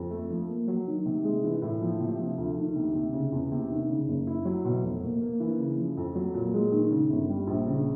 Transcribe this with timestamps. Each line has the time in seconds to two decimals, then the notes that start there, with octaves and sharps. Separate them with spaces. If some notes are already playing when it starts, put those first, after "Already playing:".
Already playing: F2
0.11 A3
0.30 F3
0.49 A#3
0.68 F#3
0.87 D#3
1.06 C3
1.24 G#3
1.44 E3
1.62 A2
1.82 F3
2.00 C3
2.19 F3
2.38 D2
2.57 D#3
2.76 C3
2.95 C3
3.13 C#3
3.32 E2
3.52 C3
3.70 D#3
3.89 C#3
4.08 F#1
4.27 E4
4.45 F#3
4.65 B2
4.83 F1
5.03 A#3
5.21 A#3
5.40 E3
5.59 C#3
5.78 F3
5.97 F2
6.15 F#3
6.34 A#2
6.54 G#3
6.72 D#3
6.91 C#3
7.10 G1
7.30 G3
7.47 A#1
7.67 C#3